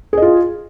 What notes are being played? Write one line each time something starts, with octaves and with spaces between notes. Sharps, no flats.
F4 G#4 D#5